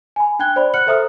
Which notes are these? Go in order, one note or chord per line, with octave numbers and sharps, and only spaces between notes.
G#5 B5
D4 G5 F#6 G#6 G7
C5 D5 B5
F#5 F6 F#6 C#7 F#7
A4 C5 E5 A#5 D#6 F6